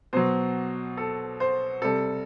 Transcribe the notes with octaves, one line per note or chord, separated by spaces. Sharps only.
B2 F#3 C5
A4
C5
C3 G3 A4